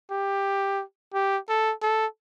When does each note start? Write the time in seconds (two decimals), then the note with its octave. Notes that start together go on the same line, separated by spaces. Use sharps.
0.11 G4
1.14 G4
1.49 A4
1.82 A4